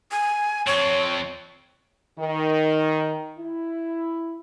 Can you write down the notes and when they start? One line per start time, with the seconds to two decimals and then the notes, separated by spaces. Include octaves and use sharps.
0.11 G#5
0.67 F2 C4 C#5
2.18 D#3
3.39 E4